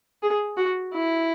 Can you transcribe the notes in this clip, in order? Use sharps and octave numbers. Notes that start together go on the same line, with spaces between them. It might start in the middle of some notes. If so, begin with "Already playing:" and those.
G#4
F#4
E4